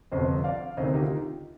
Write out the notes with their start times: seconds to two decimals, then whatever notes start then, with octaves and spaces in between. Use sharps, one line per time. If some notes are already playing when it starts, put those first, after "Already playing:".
0.12 G1 F2 C3 C5 D#5
0.44 D5 F5
0.77 D2 C3 D#3 C5 D#5
0.93 D#4 G4
1.02 F4